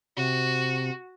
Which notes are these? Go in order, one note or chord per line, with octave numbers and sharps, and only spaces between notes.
C3 F#4